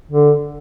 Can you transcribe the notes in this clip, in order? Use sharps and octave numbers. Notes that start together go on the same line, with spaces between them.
D3